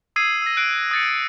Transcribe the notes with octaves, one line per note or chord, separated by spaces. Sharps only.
D#6 E6 G#6 C7 D#7
E6 A#6
F#6 C7 D7
D#6 A6 C#7